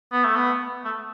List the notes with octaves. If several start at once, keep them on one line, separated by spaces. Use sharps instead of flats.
B3
A3
B3
A3